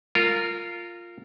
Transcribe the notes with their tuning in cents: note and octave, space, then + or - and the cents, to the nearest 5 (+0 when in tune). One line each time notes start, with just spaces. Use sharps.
F4 +0 A#4 -25